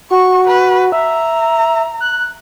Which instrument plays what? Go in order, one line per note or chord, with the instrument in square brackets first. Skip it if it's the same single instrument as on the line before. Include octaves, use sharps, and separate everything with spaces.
[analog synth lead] F#4 [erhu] C#6
[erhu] B4
[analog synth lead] E5 [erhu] A#5
[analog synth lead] F#6